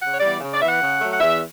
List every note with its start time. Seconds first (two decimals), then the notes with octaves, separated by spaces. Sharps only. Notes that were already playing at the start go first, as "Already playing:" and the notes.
0.01 C#3 F#5
0.12 C#5
0.20 E3 G3 B3 D5
0.40 C#3
0.54 D5
0.61 E3 B3 E5
0.67 F#5
0.81 C#3
1.01 F#3 A3
1.12 F#5
1.21 E2 E5